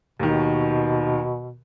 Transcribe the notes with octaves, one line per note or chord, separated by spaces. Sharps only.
D#2 B2 D#3